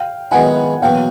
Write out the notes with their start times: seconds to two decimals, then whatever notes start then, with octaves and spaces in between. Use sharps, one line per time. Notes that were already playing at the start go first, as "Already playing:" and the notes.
Already playing: F5 G5
0.31 F#2 D#3 G#3 B3 E4 F#5 G#5
0.82 E2 B2 F#3 A#3 F5 G5